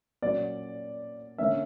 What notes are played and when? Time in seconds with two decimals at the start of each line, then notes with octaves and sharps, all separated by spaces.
0.22 A#2 F#3 C#4 D5
1.38 D3 A#3 C#4 E5